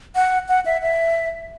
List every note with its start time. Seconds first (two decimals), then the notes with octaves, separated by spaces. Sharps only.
0.15 F#5
0.49 F#5
0.66 E5
0.82 E5